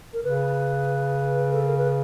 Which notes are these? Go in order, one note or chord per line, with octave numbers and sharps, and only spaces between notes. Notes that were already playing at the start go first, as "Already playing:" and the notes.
A#4
C#3 B4
A4
A#4
B4